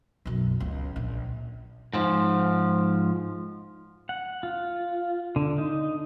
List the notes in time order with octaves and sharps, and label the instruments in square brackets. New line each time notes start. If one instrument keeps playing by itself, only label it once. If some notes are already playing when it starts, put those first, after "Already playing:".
[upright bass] B1 F#2
C#2
A#1
[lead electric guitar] G#2 F3
[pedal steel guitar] F#5
F4
D3
D#4